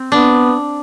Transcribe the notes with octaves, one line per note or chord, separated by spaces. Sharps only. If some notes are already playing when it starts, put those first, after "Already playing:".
Already playing: C4
B3 D4